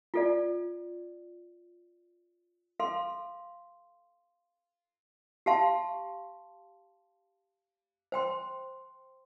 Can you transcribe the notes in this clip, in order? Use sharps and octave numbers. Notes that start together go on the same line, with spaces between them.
F4 A4 D5
A4 F5 C6
G4 F5 A5 C6
C5 G5 C6